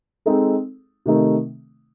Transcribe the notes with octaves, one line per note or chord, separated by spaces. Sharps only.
G#3 C4 D#4 A4
C3 D#3 A3 D#4